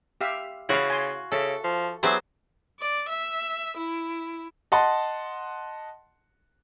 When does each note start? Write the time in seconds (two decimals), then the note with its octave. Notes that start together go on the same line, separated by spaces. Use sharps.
0.21 G4 E5 F5
0.69 C#3 E4 F#4 F5
0.90 G#5 C6
1.32 C#3 A4 E5
1.64 F3
2.03 F#3 B3 E4 G4 G#4 C5
2.80 D5
3.09 E5
3.77 E4
4.72 D#5 F#5 A5 C6